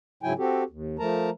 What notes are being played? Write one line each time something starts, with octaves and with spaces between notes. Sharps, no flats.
G#2 C#3 F#3 E4 G5 G#5
C4 F#4 G4 A4
D#2
F3 A3 A#4 A5 A#5